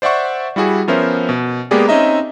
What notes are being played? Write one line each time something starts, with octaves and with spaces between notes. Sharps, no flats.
C5 D5 E5 F#5 C#6
G3 E4 F#4 G#4
F3 B3 C#4 A#4 C5 E5
B2
G#3 A#3 B3 G4 G#4 D5
C4 C#4 D#4 D#5 E5 A#5